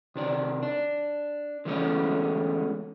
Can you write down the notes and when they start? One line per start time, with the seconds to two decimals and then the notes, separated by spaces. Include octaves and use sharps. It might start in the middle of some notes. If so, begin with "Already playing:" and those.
0.16 C3 D#3 D5
0.63 D4
1.65 D3 E3 G#3 A3 B3 C#4